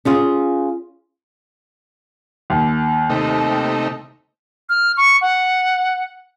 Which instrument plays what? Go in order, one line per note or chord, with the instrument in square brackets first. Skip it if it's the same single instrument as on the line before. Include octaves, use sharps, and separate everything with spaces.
[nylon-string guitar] C#4 F4 G#4
[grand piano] D#2
[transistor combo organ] C3 A3 D#4
[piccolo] F6
C#6
F#5